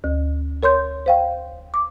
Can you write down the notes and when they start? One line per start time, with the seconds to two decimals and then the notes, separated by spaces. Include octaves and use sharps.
0.04 D2
0.63 A#4 C#5 C6 G6
1.06 C5 F5 G5
1.74 D6